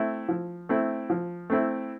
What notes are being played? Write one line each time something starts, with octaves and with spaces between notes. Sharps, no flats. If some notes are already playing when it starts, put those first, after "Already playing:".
Already playing: A3 C4 E4
F3
A3 C4 E4
F3
A3 C4 E4